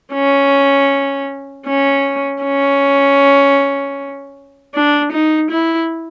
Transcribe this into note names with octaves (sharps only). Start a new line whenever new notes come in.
C#4
C#4
C#4
D4
D#4
E4